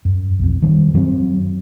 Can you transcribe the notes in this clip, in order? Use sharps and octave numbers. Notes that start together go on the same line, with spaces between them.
F#2
B1 F2
D#3 G3
F#2 F#3 G3 C4